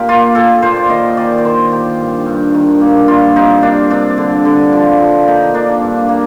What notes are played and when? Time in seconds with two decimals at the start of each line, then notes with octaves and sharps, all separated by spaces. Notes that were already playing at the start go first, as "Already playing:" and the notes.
Already playing: A#2 G4
0.08 A#3 F4
0.35 A#2 A4
0.62 A#2 C5
0.77 D5
0.90 D#3 D#5
1.17 D#3 D5
1.38 D5
1.45 D#3 C5
1.71 D#3 G4
2.00 G2
2.26 G2
2.55 D#3
2.81 A#3
3.08 G3 F4
3.36 C3 D#4
3.63 A#3 D4
3.90 C3 D4
4.18 D3
4.45 D3
4.73 F3
5.00 F3
5.27 A#3 D#4
5.54 A#3 D4
5.82 G2
6.09 A#3